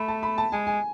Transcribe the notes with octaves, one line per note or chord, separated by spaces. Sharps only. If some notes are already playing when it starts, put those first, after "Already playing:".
Already playing: A3 B5
A5
B5
A5
G#3 G#5
G#5